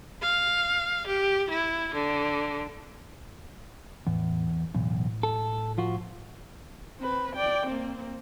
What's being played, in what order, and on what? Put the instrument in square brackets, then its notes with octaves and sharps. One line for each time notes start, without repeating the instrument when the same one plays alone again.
[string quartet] F5
G4
E4
D3
[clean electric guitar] E2 [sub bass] A2
[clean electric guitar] B1 E2 [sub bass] A2
[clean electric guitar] A4
F3 F4 F#4
[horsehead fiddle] C4 B4
D5 G5
A#3 C4